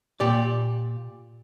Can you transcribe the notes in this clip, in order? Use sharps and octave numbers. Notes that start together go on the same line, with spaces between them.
A#2 G4 D5